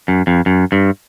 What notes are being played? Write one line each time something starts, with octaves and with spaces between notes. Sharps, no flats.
F#2
F2
F#2
G2